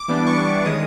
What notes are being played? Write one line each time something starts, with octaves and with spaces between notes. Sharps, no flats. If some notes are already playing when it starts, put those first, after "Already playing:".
Already playing: D6
E3 G3 B3 D4
C#6
D6
D#3 G#3 C#4 D#6